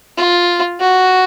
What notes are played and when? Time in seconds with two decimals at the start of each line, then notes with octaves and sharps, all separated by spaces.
0.17 F4
0.80 F#4